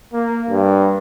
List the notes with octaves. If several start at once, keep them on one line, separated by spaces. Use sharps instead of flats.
A#3
G2